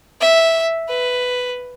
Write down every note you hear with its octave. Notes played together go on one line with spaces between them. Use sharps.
E5
B4